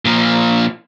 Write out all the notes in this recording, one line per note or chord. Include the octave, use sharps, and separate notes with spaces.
A#2 F3